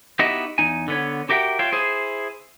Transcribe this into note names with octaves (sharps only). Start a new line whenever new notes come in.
B3 D#4 E4 F#4 G4 D#5
E2 D#4 G#5
D3 B3 C#5
F#4 G4 A#4 E5 F#5 G5
F4 C#5 E5 F5 G5
E4 G#4 C5